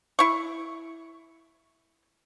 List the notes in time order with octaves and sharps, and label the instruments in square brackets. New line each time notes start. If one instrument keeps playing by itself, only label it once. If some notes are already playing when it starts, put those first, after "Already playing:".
[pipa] E4 C#6